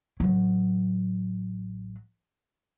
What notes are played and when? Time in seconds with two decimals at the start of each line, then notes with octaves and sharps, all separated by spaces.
0.20 A1 F#3